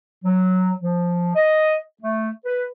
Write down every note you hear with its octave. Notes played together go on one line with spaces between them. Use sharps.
F#3
F3
D#5
A3
B4